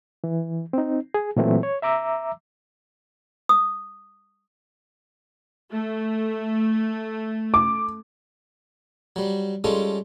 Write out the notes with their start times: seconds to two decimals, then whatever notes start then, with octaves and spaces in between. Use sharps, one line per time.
0.24 E3
0.73 C4 D#4
1.14 G#4
1.37 A#2 E3 F#3 A3 C4
1.63 C#5
1.82 E5 A#5 D6 E6
3.49 D#6
5.72 A3
7.54 D6
9.16 F#3 G3
9.64 G3 G#3 C#4 F4 A4